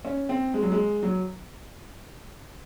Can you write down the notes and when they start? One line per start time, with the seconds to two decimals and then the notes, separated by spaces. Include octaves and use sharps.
0.05 C#4
0.29 C4
0.54 G#3
0.62 F#3
0.72 G#3
1.03 F#3